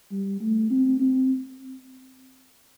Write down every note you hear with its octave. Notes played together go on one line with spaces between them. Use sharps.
G3
A3
C4
C4